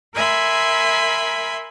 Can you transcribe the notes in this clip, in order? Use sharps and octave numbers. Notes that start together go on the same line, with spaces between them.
A#4 E5 G#5 B5 C6